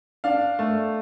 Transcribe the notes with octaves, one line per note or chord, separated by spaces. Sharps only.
D4 F5
A3